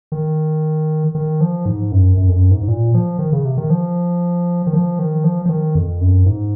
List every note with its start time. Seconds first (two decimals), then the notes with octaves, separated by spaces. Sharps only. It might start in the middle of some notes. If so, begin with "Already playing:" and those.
0.12 D#3
1.15 D#3
1.41 F3
1.66 G#2
1.92 F#2
2.17 F#2
2.29 F2
2.34 F#2
2.51 G#2
2.63 G#2
2.68 A#2
2.94 F3
3.19 D#3
3.33 C#3
3.45 C3
3.57 D#3
3.70 F3
4.67 D#3
4.73 F3
4.99 D#3
5.24 F3
5.46 F3
5.49 D#3
5.75 F2
6.01 F#2
6.26 G#2